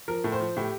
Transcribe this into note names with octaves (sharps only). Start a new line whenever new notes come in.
F3 A#4
A2
C5
F3
A2 G4